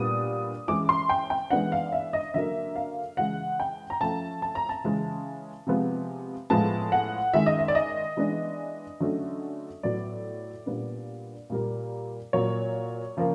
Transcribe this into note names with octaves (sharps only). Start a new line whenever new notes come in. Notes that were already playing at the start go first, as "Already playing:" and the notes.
Already playing: A#2 G3 B3 D4 D#6
E3 G#3 C#4 D6
C6
G5
G5
E3 G#3 B3 D4 F#5
F5
E5
D#5
D3 F#3 A#3 E5
F5
C#3 E3 G#3 F#5
G5
A#5
F3 A3 C#4 A5
A5
A#5
A5
C#3 E3 G#3 C#4
C3 F3 G#3 B3
A2 F3 G#3 B3 A5
F#5
D#3 G#3 C#4 E5
D#5
E5
D5
D#5
E3 G#3 B3 D4
D3 F#3 A3 C#4
A2 F#3 B3 D5
A#2 G3 B3 D4
A#2 G3 A#3
A#2 F#3 A#3 C#5
C#3 F3 A#3